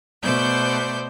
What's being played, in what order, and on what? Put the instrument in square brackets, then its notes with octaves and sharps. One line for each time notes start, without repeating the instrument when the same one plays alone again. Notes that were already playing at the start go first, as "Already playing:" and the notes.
[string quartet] B2 A3 C5 D5 G6